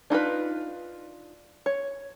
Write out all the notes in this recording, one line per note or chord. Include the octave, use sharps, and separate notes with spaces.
D4 D#4 F4 B4
C#5